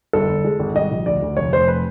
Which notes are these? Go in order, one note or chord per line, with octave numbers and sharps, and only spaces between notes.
G1 A4
G1
G#3
G#1
G3 D#5
A#1
D2 D5
D2
F1 C#5
F1 C5
B4